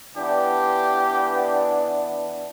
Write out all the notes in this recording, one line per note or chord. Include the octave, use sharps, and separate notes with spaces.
E3 B3 D4 G4